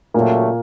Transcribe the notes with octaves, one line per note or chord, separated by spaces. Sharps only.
A#2 C#3 F#3 A3 A#3